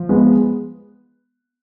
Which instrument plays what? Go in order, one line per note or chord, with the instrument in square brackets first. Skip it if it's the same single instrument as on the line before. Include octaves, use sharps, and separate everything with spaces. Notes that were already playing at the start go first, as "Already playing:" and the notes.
Already playing: [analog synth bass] F3
[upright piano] G#3 B3